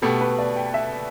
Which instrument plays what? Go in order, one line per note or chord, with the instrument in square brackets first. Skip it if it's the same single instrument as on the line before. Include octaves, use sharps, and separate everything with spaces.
[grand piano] B2 A3 G4 [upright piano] A4
[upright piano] B4
D5
G5
E5